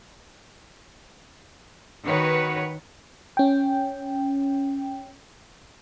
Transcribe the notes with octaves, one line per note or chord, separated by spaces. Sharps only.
D#3 F#4 B4 C#5
C#4 G5